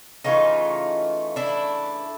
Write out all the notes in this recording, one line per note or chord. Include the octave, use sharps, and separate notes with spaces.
C#3 E3 A3 D#4 F4
D4 E4